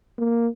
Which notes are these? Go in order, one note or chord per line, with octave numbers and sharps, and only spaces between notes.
A#3